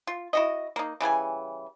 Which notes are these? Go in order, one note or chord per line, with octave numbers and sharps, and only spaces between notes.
F4
E4 F#4 D#5
A#3 D#4
C#3 E3 G3 G#5